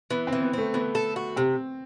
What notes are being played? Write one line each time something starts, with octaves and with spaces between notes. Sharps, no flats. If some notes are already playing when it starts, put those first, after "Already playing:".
E3 B3
C4
E3
B3
A3 C4
E3 B3
A4
F#4
C3 C4